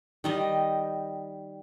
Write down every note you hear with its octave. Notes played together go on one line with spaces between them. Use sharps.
D#3 G3 D#5